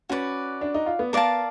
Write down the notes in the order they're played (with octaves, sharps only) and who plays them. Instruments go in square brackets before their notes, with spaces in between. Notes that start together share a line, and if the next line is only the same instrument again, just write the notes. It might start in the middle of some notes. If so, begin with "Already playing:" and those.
[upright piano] C#4 [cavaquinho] F#4 B4 D5
[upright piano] D4
D#4
F4
B3
[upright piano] B3 [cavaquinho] A#4 D5 F5 A5